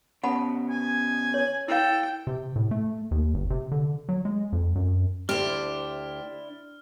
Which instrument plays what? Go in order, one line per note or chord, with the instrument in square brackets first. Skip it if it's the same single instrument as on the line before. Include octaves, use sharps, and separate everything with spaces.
[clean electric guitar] C#3 B3 [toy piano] F#5 A5 B5
[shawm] G#5
[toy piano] C#5
[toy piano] E4 F5 [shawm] A4 [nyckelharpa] G5
[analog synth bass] C3
A2
A3
D#2
G1
C3
D3
F#3
G#3
F2
F#2
[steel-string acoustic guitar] D2 G4 [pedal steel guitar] D4 E4 C5 [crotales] F6